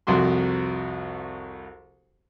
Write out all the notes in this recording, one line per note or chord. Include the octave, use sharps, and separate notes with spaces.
C2 F2 F#4 C6